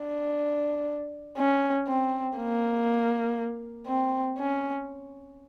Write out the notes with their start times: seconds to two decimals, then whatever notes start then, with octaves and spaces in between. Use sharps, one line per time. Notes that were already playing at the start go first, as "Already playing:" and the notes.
Already playing: D4
1.38 C#4
1.88 C4
2.37 A#3
3.87 C4
4.38 C#4